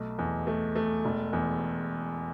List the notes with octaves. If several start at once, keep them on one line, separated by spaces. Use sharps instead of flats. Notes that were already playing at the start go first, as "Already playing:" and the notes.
Already playing: B1 A3
E2
A3
A3
E1
E2